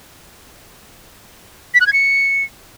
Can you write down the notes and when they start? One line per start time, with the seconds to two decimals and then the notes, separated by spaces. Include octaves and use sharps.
1.74 B6
1.80 F#6
1.87 G#6
1.93 C#7